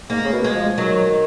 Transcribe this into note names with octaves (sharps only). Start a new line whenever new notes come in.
G#2 A#3
C#3
B2
G#3
F3
D#3 F#3